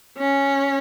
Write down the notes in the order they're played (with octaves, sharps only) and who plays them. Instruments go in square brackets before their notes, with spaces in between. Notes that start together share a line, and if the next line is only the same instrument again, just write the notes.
[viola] C#4